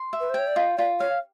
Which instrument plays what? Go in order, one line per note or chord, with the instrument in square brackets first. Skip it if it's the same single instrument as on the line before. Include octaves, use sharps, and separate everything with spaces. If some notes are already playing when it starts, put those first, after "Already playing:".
Already playing: [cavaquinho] C6
E5
[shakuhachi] B4
C5
[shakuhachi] C#5 [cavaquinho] G5
[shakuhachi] D5
[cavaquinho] F4 [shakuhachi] D#5
[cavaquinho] F4 [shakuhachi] D5
[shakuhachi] C#5 [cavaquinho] F5